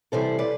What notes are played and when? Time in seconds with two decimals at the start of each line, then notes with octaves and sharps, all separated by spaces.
0.12 C3 E3 G3 A4 C5
0.39 B4 D5